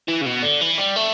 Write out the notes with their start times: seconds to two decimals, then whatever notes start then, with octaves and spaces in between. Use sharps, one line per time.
0.08 E3
0.21 C#3
0.26 B2
0.43 D3
0.61 E3
0.79 G3
0.96 A3